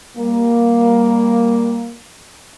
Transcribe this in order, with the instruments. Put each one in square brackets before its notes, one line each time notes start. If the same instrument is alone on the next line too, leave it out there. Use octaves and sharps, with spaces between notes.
[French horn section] G3 A#3